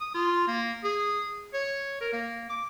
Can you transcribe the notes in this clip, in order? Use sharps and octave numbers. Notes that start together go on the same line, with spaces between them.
D#6
F4
A#3
G#4
C#5
A#4
A#3
D6